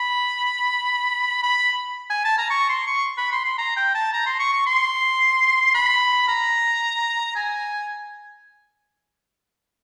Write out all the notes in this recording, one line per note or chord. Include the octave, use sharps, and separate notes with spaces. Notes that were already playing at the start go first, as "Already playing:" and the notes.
Already playing: B5
B5
G#5
A5
A#5
C#6
C6
C#6
B5
C6
C6
A#5
G5
A5
A#5
C6
C#6
C#6
C6
B5
A#5
G#5